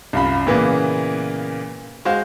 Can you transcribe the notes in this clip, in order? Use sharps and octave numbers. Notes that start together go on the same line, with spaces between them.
C2 F#2 F4 B5
A#2 C#3 E3 A#3 B3
G#3 F#4 C5 F5